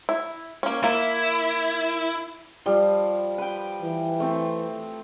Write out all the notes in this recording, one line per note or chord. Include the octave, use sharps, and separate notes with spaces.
E4
A#3 C#4
A#3 E4
F3 G3
B4 G5
E3
A3 C4